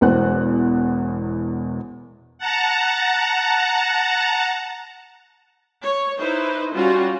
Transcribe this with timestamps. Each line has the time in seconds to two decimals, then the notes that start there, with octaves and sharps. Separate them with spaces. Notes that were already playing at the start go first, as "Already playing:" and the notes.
0.01 E1 E2 B2 C5 F#5 F#6
2.38 F#5 A5 A#5
5.83 C#5
6.18 D#4 E4 B4 C5
6.74 G3 C#4 F4 F#4